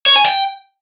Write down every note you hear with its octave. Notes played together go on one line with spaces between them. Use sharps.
C#5
G#5
G5